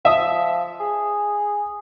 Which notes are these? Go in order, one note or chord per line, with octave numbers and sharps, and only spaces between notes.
F3 E5 D#6
G#4